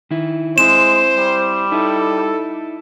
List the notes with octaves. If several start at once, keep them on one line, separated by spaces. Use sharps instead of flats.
D#3 E4
G#3 C4 E4 C5 E7
G3
D#4 E4 A4